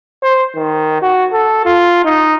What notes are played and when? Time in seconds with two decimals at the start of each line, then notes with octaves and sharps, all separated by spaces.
0.23 C5
0.55 D#3
1.02 F#4
1.33 A4
1.66 F4
2.05 D#4